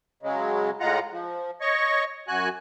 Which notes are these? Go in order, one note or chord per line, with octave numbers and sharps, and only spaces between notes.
C#3 F#3 G#3
A2 G#3 F4 F#5 A#5
F3
C#5 D#5 C#6
F#2 F#4 G#5 F#6